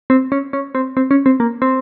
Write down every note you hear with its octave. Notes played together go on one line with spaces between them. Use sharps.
C4
C#4
C#4
C4
C4
C#4
C4
A#3
C4